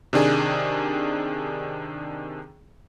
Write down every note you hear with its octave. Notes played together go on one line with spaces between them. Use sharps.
C3 D#3 D4 G#4